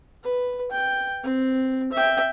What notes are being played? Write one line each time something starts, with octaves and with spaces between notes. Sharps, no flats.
B4
G5
C4
E5 G5